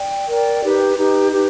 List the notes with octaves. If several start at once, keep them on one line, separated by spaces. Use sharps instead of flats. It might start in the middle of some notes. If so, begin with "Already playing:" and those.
Already playing: D5 G5
A#4 D5 G5
D#4 G4 B4
D#4 G4 B4
D#4 G4 B4